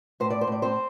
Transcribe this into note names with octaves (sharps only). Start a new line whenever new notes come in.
A2 C5
D5
C5
A2 D5
C4 C5